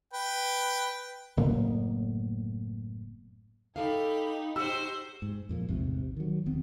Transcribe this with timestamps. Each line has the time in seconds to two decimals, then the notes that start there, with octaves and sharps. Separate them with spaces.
0.13 B4 G5
1.37 F#1 A2 A#3 B3
3.76 D#4 G4 A4 F5 B5
4.56 F#4 G4 C5 E6
5.22 G#2
5.49 F2 A#2 F3
5.69 A1 E2 G#2 C3
6.17 D#3 F#3
6.46 E1 D#3 B3 C4